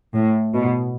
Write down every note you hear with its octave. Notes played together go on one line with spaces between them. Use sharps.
A2
B2